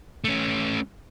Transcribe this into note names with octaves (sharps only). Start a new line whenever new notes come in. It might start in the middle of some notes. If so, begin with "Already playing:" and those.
A3 C#4